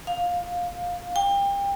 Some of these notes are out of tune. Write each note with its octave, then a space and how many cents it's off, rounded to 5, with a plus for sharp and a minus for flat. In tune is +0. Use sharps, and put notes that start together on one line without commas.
F5 +15
G5 +30